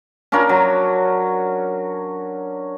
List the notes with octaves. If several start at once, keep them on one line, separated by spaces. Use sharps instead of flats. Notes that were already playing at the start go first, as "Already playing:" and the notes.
C#4 D4 F4 A#4
F#3